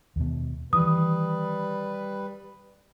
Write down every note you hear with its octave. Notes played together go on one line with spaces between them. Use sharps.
D#2 B2
D#3 E3 G3 B4 D#6